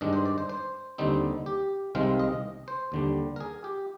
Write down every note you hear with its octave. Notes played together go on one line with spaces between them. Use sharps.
G2 D#3 G#3 D4 D#5
C5
D5
C5
C5
D#2 D3 G3 C4 D#4
G4
C2 C3 D#3 G#3 C4 F5
D#5
C5
D#2 D3 G3
A#4
G#4
G4